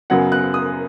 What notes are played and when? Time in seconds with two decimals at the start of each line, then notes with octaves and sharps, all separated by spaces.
0.10 F#2 C#3 F#3 B3 F#5
0.32 F#6
0.54 D#6